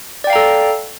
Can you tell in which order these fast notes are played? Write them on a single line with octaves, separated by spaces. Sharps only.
D5 G5 F5 A#5 A4